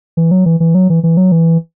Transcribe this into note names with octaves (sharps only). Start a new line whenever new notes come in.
E3
F#3
E3
E3
F#3
E3
E3
F#3
E3